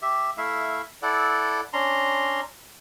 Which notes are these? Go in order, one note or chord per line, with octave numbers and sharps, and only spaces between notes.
G4 E5
A3 E4 E5 F5
E4 A4 D5 F#5
C#4 D4 A#5 C6